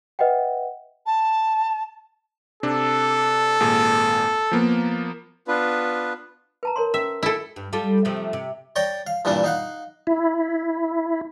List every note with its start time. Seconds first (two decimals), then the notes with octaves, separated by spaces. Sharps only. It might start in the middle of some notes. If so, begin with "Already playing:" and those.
0.19 B4 D#5 E5 F#5 G5
1.06 A5
2.63 C3 D4 A4
3.60 G#1 A#2 G#4
4.52 F3 A#3 B3
5.48 B3 D4 F4 B4
6.63 B4 A5 A#5
6.76 A#4 C#5 C6
6.94 C#4 E5
7.23 E4 A4
7.56 G2
7.73 G3 F4 A4
8.05 C3 F3 A3
8.33 C3
8.76 C#5 D5 G5 A#5
9.07 F5
9.25 G2 A#2 E3 G3 D4
9.44 D#4 F5 F#5
10.07 E4